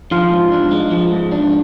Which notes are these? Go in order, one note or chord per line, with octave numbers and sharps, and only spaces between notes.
F3 F4
G#2
D4
G#3
F3
G#2
D4